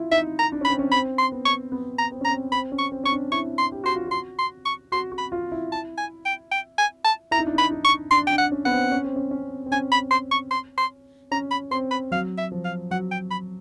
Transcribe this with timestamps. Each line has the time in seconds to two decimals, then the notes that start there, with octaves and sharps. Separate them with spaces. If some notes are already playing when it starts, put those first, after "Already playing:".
Already playing: E4 F4
0.12 D#4 E5
0.39 A#5
0.52 D4
0.61 C#4
0.65 B5
0.70 C4
0.79 C#4
0.92 C4 B5
1.18 C6
1.32 B3
1.45 C#6
1.72 B3
1.98 A#5
2.12 C4
2.21 C#4 A#5
2.30 C4
2.52 C4 B5
2.72 C#4
2.78 C#6
2.92 C4
3.04 C#4 C#6
3.12 D4
3.32 E4 C#6
3.58 C6
3.72 G4
3.84 F#4 C6
3.95 F4
4.07 F#4 C6
4.38 C6
4.65 C#6
4.92 F#4 C6
5.12 F#4
5.18 B5
5.32 F4
5.52 E4
5.72 A5
5.98 G#5
6.25 G5
6.51 G5
6.78 G#5
7.04 A5
7.31 E4 A#5
7.39 D#4
7.47 D4
7.54 D#4 B5
7.71 D#4
7.84 C#6
8.11 D4 C6
8.27 D4 G5
8.38 F#5
8.52 C#4
8.65 B3 F#5
8.72 C4
8.92 C#4
9.04 C4
9.16 C#4
9.31 C#4
9.66 C4
9.72 C#4 G#5
9.92 B5
10.11 C6
10.31 C#6
10.51 C6
10.78 C6
11.31 C#4 A#5
11.51 B5
11.71 C4 C6
11.91 B5
12.11 F#3 F5
12.38 E5
12.52 F3
12.65 F5
12.91 F#3 F#5
13.11 G5
13.31 B5